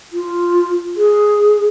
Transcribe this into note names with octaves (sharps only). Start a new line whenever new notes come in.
F4
G#4